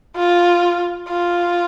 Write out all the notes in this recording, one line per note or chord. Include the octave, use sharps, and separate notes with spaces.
F4
F4